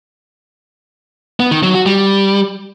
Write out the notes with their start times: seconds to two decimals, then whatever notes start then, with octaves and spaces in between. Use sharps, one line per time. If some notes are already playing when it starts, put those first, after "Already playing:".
1.40 B3
1.51 D#3
1.63 F#3
1.75 F#4
1.86 G3